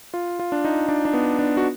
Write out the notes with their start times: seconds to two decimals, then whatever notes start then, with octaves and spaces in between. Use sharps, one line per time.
0.14 F4
0.40 F4
0.52 D4
0.65 D#4
0.89 D4
1.05 D4
1.14 B3
1.39 D4
1.57 F#4